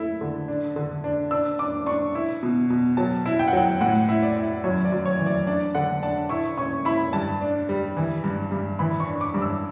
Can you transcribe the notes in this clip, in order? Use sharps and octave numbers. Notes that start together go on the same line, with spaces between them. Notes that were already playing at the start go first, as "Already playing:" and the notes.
Already playing: A3 E4
D3
D4
D3
D4
D4 E6
D4 D6
D4 C#6
E4
B2
B2
F#3 A5
E4
G5
F#5
F#3 G5
A2 F#5
E4
D5
E4
F#2 C#5
D5
F#2
C#5
E3
D5
D4 D5
D3 F#5
D4 A5
E4 C#6
C#4 C#6
E4 B5
G2 A5
D4
G3
E3
G2
G2
E3 B5
C#6
D4
D6
G2
E6